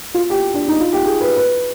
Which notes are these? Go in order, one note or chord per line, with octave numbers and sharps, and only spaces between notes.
F4
G4
D4
D#4
F4
G4
G#4
B4
B4